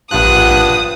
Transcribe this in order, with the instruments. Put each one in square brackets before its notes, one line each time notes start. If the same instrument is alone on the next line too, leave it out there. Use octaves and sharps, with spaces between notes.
[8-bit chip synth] A#1 F#6 [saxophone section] G2 [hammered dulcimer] F3 F#5 [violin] D#6